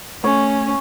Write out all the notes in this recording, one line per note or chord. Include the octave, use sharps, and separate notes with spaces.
A3 C#4 C#5